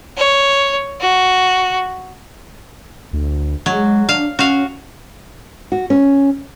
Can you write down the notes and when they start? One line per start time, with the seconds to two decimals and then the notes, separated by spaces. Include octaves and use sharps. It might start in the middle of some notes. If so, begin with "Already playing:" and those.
0.17 C#5
1.00 F#4
3.13 D2
3.66 F#3 G#3
4.09 D4 F5
4.39 C#4 F#4 F5
5.72 F#4
5.90 C#4